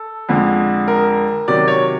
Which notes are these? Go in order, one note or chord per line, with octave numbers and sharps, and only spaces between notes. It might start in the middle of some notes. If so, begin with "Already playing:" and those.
Already playing: A4
F2 D3 F3 G#3
A#4
C3 D#3 F#3 D5
C#5